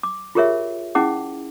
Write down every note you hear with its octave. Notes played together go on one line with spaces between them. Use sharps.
D6
F4 G4 G#4 A#4 C#5 E5
C#4 E4 G#4 F#5 D6